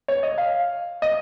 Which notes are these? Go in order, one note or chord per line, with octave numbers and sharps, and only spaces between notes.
C#5
D#5
F5
D#5